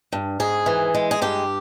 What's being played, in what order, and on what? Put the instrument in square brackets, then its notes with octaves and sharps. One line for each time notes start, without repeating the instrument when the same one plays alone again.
[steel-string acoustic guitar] G2
G#2 G#4
E3
G#3
G#4
G2 G4